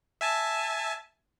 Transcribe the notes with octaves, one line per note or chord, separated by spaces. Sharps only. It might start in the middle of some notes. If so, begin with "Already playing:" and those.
E5 G#5 A5